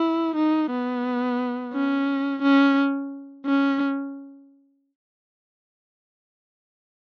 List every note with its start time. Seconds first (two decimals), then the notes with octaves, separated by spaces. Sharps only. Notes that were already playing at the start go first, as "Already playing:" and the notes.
Already playing: E4
0.36 D#4
0.70 B3
1.74 C#4
2.42 C#4
3.46 C#4